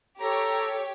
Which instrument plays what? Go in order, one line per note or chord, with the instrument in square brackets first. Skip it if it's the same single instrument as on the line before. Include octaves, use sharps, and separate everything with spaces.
[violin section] G4 C#5 [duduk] A4 [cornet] A#5